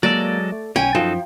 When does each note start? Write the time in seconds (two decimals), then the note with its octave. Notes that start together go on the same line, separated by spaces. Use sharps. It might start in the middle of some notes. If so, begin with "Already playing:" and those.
0.03 F#3 G#3 A#3 A4 D5
0.52 A3
0.76 B1 C#4 G5 G#5
0.95 F#2 F3 D#4 F#4 A4